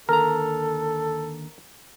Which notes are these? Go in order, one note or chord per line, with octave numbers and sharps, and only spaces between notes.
D#2 D3 A4 A#4 A#5